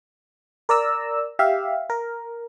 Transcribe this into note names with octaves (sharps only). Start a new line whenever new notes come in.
A#4 D5 A#5 E6
G4 E5 F5
A#4